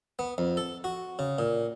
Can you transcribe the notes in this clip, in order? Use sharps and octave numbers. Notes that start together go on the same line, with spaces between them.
B3
F2
A4
F#4
C#3
A#2